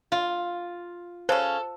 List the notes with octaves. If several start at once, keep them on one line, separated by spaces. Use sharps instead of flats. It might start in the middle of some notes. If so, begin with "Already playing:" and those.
F4
C#3 C#4 A4 C5